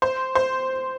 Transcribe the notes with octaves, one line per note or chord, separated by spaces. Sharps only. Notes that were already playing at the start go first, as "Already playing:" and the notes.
C5
C5